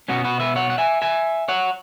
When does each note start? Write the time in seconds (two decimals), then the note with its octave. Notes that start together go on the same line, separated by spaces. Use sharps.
0.08 B2 B3 C#4 F#4
0.25 F#4 B4
0.40 B4 E5
0.56 C#5 F#5
0.70 F#5
0.78 E5 G#5
1.02 E5 G#5
1.48 C#5 F#5